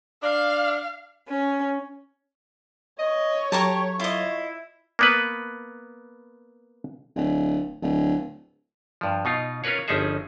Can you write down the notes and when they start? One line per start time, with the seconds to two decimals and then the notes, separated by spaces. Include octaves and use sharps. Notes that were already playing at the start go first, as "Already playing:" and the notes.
0.23 D4 F5
1.28 C#4
2.99 C#5 D#5
3.52 F#3 G4 A4 A5 A#5 C#6 G#6
4.00 E4 F4 D#5
4.99 A#3 B3 B4
7.16 D1
7.82 D1
9.01 G2 F3
9.25 B2 D#4 F4
9.64 C#4 F4 A#4 B4 C#5
9.88 G1 F3 C#4 D#4 G#4 E5